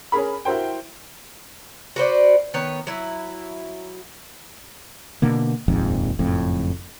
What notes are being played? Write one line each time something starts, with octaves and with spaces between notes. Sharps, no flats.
C#4 G#4 A#4 B5
E4 F#4 A#4 C5 G5
F#4 B4 C5 D5
D#3 B3 C#5
F#3 E4
B2 D3 A#3
D#1 A#1 F2 G#2
F#1 F2 A2